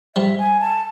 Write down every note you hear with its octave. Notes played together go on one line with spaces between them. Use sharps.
F3 G3 E5
G#5
A5